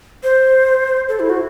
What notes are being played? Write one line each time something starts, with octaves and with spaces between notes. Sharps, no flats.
C5
A4
E4
F#4